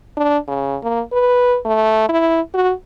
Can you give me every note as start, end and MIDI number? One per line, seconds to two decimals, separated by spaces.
0.17 0.38 62
0.48 0.77 49
0.83 1.01 58
1.13 1.57 71
1.65 2.08 57
2.09 2.41 64
2.54 2.72 66